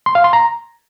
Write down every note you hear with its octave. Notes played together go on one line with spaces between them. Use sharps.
C6
F5
C6
A#5